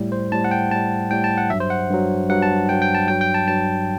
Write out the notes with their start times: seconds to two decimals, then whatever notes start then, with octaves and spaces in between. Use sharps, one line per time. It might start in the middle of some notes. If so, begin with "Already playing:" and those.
Already playing: A2 G3
0.12 C5
0.32 A2 G3 A5
0.44 F#5
0.51 G5
0.71 A2 G3 A5
1.11 A2 G3 G5
1.24 A5
1.38 F#5
1.50 G2 F#3 E5
1.60 C5
1.70 F#5
1.90 G2 F#3
2.29 G2 F#3 F#5
2.42 A5
2.69 G2 G5
2.73 F#3
2.82 G5
2.95 A5
3.08 G2 F#3 G5
3.21 G5
3.34 A5
3.47 G2 F#3 A5